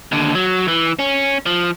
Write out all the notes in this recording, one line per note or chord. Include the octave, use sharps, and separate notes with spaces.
D#2 D3
F#3
E3
C#4
F3